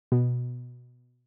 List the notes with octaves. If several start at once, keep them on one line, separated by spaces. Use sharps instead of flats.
B2